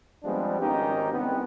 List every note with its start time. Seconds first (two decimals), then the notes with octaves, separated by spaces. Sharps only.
0.24 F3 G3 G#3 B3 C4 D4
0.60 G#1 D#3 C#4 D#4 G4
1.12 C2 B3 C4